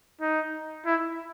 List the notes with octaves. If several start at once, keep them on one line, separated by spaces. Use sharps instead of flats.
D#4
E4